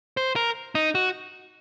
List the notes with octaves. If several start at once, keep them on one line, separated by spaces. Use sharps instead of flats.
C5
A#4
D#4
F#4